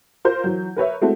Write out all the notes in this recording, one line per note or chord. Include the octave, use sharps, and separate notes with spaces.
F4 A#4 C5 G6
E3 F#3
A#4 B4 C#5 E5
G#3 A3 C4 E4 F#4 A4